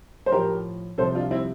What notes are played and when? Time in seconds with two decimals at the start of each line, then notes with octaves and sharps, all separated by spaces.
0.26 C5
0.32 A2 F3 G4 A#4
0.98 C2 C3 F3 A4 C5
1.15 D4 F4
1.31 C4 E4